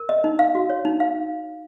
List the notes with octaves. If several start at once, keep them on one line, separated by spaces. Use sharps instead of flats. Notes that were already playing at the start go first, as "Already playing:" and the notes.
Already playing: A#4
D#5
D#4
F5
F#4
C#5
D#4
F5